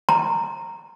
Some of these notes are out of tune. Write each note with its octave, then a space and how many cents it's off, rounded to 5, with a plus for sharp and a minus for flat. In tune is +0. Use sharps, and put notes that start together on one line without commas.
A#5 -10